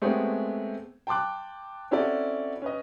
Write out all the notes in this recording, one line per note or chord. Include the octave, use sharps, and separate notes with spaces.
G#3 A3 B3 C4 G4 C#5
G5 A5 C6 D6 F#6
C4 C#4 E4 F#4 A4 D5
C#4 B4 D#5